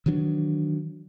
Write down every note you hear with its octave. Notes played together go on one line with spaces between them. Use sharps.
D#3 E3 F#3 D4